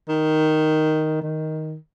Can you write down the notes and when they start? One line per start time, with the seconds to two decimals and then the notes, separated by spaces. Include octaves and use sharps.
0.08 D#3
1.22 D#3